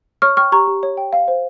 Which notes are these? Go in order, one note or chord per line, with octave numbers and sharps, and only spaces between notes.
C#5 C#6 F6
G5 C#6 F6
G4 A#5 C#6
G4
C#5
G5
F5
C5